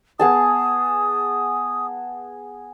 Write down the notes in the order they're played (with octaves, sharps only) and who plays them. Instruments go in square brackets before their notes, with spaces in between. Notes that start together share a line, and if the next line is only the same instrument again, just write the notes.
[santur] B3 G#4 A5 [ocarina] D#6